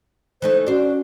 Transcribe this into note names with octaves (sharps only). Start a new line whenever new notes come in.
E3 A3 D#4 C5
C#4 D4 F#4 C5